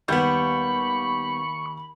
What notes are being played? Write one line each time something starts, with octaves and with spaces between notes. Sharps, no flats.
D#2 G3 B3 B5 C#6 G6